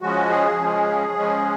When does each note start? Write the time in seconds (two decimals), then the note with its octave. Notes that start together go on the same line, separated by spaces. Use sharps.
0.01 C#3 F3 G#3 C#4 F#4
0.30 G#4
0.59 C#3 F3 G#3 C#4
1.16 C#3 F3 G#3 C#4